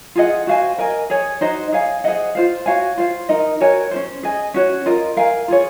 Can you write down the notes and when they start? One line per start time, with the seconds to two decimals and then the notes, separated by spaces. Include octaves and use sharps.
0.15 F4 G#4 D#5 F#5
0.47 F#4 C5 F5 G#5
0.78 A#4 D#5 G#5
1.10 G#4 C#5 G#5
1.41 D#4 F#4 C5 D#5
1.72 G#4 C#5 F5 G#5
2.04 G#4 C5 D#5 F#5
2.35 F4 C5 F5
2.66 F#4 C#5 F5 G#5
2.98 F4 C5 F5
3.29 D#4 A#4 D#5
3.60 F#4 A#4 C#5 G#5
3.91 C#4 F#4 C5
4.23 G#4 D#5 G#5
4.54 C#4 F#4 C#5
4.86 F4 A#4 D#5
5.17 A#4 F5 G#5
5.48 F4 G#4 C#5